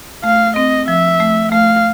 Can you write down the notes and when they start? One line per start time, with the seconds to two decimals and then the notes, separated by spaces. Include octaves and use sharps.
0.24 A3 F5
0.56 C4 D#5
0.88 F3 E5
1.20 A3
1.52 A3 F5